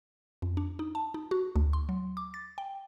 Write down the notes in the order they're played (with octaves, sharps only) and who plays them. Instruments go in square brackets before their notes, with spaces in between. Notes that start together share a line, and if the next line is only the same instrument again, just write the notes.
[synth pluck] F2
D4
D#4
A5
D#4
F#4
D2
C6
F#3
D6
A6
G5